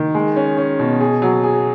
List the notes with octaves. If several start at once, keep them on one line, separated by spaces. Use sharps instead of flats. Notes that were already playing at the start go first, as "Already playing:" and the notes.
Already playing: D#3
G#3
C#4
C#4
B2
G#4
F#3
G#4